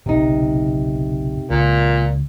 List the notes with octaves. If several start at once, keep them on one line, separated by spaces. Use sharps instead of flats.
F#1 B1 C3 D#4
C#2 A#2